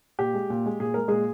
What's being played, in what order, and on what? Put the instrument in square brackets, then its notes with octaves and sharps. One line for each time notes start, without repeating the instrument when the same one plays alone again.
[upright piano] A#2 G4
G#3
A#2
G#3
A#2 G#4
G#3 A#4
A#2 G#3 G#4